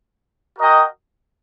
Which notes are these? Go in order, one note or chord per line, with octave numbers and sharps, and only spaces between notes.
F#4 A#4 D#5 G5